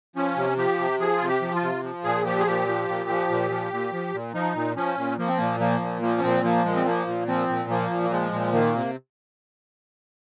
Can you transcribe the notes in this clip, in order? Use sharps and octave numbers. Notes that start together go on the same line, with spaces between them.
F3 C#4
C3
F3 G4
C3
F3 G#4
C3 F4
G4
F3
F4
C3
F3
A#2 G#4
F3 G4
G#4
A#2 G4
F3
A#2
F3
A#2
F3
A#2
F3
A#2
F3 D#4
A#2
F3 C#4
A#2
F3 A#3
C4
A#2 A#3
F3 A#3
A#2
F3 A#3
C#4
A#2 C4
F3 A#3
A#2 G#3
C4
F3 A#3
A#2
F3 C4
A#2
F3 A#3
A#2
A#3
F3 G#3
A#2
D#3 A#3
C3